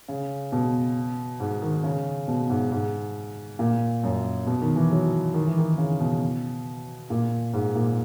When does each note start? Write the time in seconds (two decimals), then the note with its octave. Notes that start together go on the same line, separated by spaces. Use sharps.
0.08 C#3
0.52 B2
1.40 G#2
1.62 D#3
1.83 C#3
2.28 B2
2.49 G#2
2.71 G#2
3.59 A#2
4.03 F#2
4.47 B2
4.61 D#3
4.76 E3
4.91 F#3
5.34 D#3
5.47 E3
5.58 D#3
5.78 C#3
6.00 B2
7.10 A#2
7.53 G#2
7.75 A#2